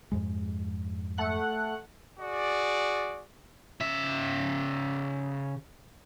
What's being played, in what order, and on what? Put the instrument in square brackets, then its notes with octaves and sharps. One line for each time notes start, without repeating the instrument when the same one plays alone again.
[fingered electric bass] F2 G#2 G#3
[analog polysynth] A3 F#5 F#6
[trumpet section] F#4 G#4 D5
[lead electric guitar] C#3 E5